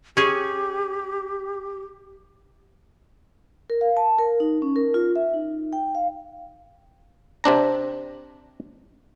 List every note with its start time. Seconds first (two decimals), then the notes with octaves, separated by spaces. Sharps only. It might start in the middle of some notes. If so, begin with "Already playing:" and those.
0.17 C#4 G4 G#4
3.70 A#4
3.81 F5
3.97 A5
4.19 A#4
4.40 D#4
4.62 C#4
4.76 A#4
4.94 F4
5.16 E5
5.33 D#4
5.73 G5
5.95 F5
7.44 C3 C4 D4 A#5